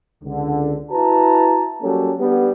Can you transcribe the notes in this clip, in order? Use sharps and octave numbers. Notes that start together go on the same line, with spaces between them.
C#2 D3
E4 F#4 B4 A5 A#5
F#3 G3 A#3 C#4 G4 A4
G3 B3 D4